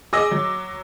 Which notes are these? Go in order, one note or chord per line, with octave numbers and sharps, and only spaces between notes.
G#4 D#5 D6 E6 A#6
F#3